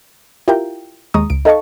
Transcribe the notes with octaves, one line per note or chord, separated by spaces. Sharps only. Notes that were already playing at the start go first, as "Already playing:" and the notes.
E4 F4 G4 A#4 G5
D#2 G#3 A#5 C#6 D#6
C#2 D7
D#4 A4 D#5 F5 A5 C#6